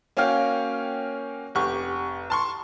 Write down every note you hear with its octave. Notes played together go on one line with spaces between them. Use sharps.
A#3 C#4 F#4 C#5 F5 G5
F1 G4 F#5 C#6
A5 C6 C#6